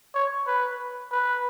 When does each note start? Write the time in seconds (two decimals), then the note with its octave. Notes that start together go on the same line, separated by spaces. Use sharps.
0.15 C#5
0.47 B4
1.12 B4